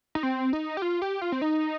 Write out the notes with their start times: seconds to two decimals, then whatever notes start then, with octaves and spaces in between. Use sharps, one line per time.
0.15 D#4
0.23 C4
0.53 D#4
0.77 G4
0.82 F4
1.02 G4
1.21 F4
1.32 C4
1.42 D#4